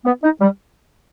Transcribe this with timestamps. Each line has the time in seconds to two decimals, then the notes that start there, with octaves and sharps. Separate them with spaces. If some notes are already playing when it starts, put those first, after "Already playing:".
0.05 B3
0.23 D#4
0.40 G3